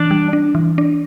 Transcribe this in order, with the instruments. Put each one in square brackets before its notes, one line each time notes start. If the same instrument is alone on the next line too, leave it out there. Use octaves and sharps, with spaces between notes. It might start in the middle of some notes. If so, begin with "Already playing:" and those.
Already playing: [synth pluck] E3 [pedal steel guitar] D4 D5
[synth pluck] G3
D4
E3
D4